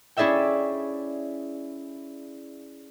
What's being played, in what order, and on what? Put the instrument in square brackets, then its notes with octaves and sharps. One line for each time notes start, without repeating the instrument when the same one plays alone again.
[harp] C#4 E4 G#4 D5 E5 G5